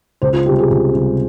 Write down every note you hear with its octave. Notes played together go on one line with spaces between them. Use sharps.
C#2 C5
F4
C3 G3 G4
G#4
C#2
C3 G3